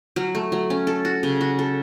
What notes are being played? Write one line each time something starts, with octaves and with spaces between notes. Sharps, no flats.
F#3
A3
F#3
C#4
A4
F#4
C#3
F#4
A4